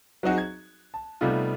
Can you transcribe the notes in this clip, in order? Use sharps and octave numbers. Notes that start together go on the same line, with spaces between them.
F#3 C4 D#4 F#4 G#4
G#6
A5
C3 G3 A3 B3 D#4 F4